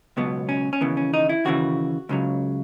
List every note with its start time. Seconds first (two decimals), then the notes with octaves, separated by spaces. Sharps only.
0.17 C#2 B2 F#3 B3
0.49 C#4
0.73 C#4
0.81 D#2 C#3 E3 B3
0.97 C#4
1.13 D#4
1.29 E4
1.45 D#2 C#3 E3 F#4
2.09 C#2 C#3 F#3